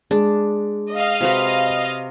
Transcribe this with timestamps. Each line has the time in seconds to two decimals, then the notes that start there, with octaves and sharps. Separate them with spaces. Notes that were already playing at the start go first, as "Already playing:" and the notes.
0.11 G#3 D4
0.92 D#5 F5
1.21 C3 F#4 B4